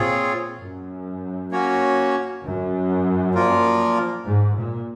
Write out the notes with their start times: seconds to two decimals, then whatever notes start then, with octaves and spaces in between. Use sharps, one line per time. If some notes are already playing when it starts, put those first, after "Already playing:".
Already playing: A#2 C4 F4 G#4 C#5
0.60 F#2
1.52 A#3 C#4 F#4 C#5
2.44 F#2
3.34 A#2 F3 A#3 F4 A#4
4.25 G#2
4.56 A#2